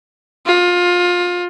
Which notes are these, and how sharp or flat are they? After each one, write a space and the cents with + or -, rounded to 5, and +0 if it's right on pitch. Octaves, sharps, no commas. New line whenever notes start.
F4 +25